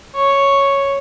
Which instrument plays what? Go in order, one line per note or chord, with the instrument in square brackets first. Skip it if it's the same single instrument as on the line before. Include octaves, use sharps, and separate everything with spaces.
[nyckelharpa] C#5